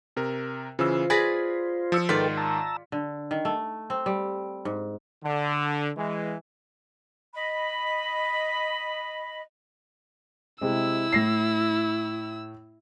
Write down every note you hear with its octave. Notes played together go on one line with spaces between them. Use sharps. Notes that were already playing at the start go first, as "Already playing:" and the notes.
C3 A#4
C#3 E3 F4 C5 E6
G#4 B4 D5 G#6 A#6 B6
F3 E6 C#7
G#2 D#3 F4 A4 B4 D5 G5 B6
A5 A#5 E6
D3
D#3
A3
C4
G3
G#2
D3
E3 G#3
D#5 B5
C3 G#3 E4 E6
A2 A#6 C7